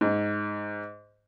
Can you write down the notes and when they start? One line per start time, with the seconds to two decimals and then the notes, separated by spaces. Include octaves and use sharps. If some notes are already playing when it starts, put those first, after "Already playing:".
0.01 G#2